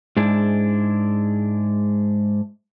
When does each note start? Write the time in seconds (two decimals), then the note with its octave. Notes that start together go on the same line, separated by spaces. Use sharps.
0.17 G#2 G#3 D4 E4